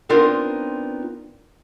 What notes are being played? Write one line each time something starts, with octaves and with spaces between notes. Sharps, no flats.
B3 C4 D4 D#4 F4 A#4